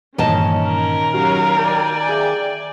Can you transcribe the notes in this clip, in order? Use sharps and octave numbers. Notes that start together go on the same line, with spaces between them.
G2 A#2 D#3 E3 C#4 D#5 A5
A#4
F#3 C#4 F#4 G4 F5
D5 G5 G#5
G#4 E5 F5